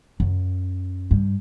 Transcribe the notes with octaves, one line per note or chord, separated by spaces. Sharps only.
F#2
G2